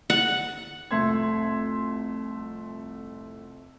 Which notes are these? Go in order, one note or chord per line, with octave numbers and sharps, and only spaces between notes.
F#5
C2 F2 A3 E5 C6 G#6